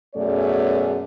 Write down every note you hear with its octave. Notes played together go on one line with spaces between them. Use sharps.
F#2 B2 A3 G#4 C#5 D5